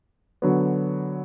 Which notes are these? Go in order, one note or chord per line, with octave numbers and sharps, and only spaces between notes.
D3 F#3 B3